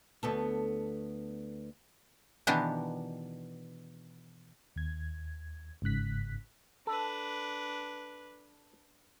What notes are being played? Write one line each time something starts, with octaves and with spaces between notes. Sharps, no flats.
D2 B3 A4
B2 D#3 E3 B3 D4 G4
D#2 G#6
G1 G#2 C#3 F#6 B6
D4 A4 B4